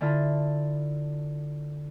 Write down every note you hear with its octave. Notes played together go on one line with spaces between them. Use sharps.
D3 E4 F4 A5